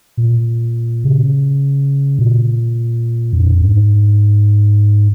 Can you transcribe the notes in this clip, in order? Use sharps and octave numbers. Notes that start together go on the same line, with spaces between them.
A#2
C#3
A#2
F2
G#2